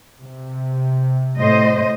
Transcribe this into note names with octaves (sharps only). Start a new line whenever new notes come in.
C3
A2 C5 D#5